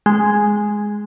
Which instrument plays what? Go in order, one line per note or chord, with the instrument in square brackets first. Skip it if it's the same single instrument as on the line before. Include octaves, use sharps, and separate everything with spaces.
[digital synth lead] G#3